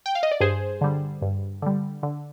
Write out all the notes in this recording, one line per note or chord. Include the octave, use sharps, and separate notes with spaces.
G5
F5
D#5
D5
G2 G#4 C5
D3 G3
G2
D3 G3
D3